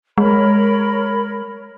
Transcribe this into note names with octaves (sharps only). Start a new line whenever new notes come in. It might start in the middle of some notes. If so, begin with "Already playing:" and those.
G#3 A#4 C#5 B5